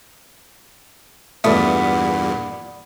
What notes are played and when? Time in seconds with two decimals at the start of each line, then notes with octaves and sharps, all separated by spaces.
1.44 E2 G2 A#2 A3 B3 D5 B5 D#6